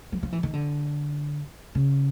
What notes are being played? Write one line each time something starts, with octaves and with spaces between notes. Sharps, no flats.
F#3
F3
E3
D#3
D3
C#3